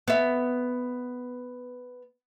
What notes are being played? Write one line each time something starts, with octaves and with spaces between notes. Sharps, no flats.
B3 E5